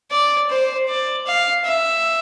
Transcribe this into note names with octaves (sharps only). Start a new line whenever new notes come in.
D5
C5
D5
F5
E5